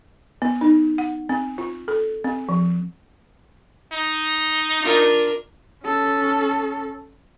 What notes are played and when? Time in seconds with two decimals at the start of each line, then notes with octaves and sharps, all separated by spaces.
0.42 B3
0.61 D#4
0.98 F#5
1.29 C4
1.58 F4
1.88 A4
2.24 C4
2.49 F3
3.93 D#4
4.81 D4 F4 A#4
5.83 C#4 A4